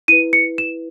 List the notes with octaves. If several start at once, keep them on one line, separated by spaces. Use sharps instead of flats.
E4 B4 D#7
C#7
E7